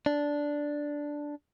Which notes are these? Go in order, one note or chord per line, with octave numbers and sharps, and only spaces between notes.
D4